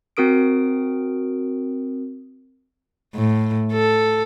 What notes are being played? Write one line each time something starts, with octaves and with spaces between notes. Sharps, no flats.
C4 F#4 A#4 D#6 D7
A2
A4